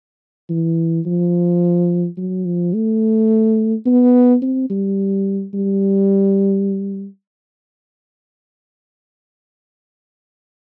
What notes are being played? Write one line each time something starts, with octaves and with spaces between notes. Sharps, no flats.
E3
F3
F#3
F3
A3
B3
C4
G3
G3